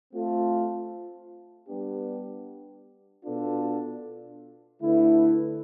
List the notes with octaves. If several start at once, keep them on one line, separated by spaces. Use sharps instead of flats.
A3 C4 F4 A4
G3 B3 D4 G4
B2 B3 D4 F4 A4
D3 A3 E4 B4